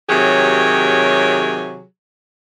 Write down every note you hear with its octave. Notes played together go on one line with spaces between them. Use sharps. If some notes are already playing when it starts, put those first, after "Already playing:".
C3 D#3 F#3 G4 G#4 C#5